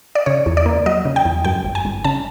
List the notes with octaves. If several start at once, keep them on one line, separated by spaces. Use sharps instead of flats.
D5
C#3 C#5
E2
D5
A#3
F#3 D#5
C#3
G5
E2
F#2 G5
G1
G#5
G1
C#3 A5